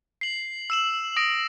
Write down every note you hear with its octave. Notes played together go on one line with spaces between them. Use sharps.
C7 F#7
E6 E7 F#7
D#6 A#6 D7